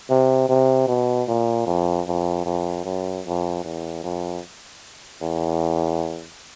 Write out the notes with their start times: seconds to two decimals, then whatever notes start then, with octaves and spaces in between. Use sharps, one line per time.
0.10 C3
0.49 C3
0.88 B2
1.28 A#2
1.66 F2
2.07 F2
2.46 F2
2.85 F#2
3.25 F2
3.64 E2
4.04 F2
5.22 E2